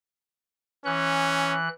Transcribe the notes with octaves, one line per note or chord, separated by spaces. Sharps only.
E3 C#4 F#6